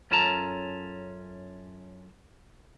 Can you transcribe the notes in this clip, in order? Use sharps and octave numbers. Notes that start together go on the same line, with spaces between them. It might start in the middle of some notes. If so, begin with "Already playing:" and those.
F#2 C#4 F4 A4 A5 A#5